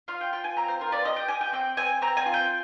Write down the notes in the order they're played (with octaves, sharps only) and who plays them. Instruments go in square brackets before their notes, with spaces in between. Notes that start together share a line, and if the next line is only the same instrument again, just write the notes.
[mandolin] F4 F5
G5
F4 G5
G#5
C4 A#5
C5
F4 A#4
D5
G4 D#5
G5
G4 G#5
G5
C4 G5
C4 G#5
C4 A#5
G#5
F4
G5